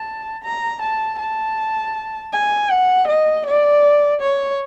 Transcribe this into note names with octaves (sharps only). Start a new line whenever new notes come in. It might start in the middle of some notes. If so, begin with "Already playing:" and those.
Already playing: A5
A#5
A5
A5
G#5
F#5
D#5
D5
C#5